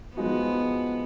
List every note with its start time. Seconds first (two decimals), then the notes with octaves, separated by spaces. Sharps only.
0.16 F3 G#3 B3 D#4 F#4